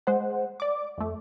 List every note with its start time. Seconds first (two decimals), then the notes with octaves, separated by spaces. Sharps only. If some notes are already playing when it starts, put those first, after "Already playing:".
0.07 G#3 C5 F#5
0.60 D5 D6
0.98 F2 A3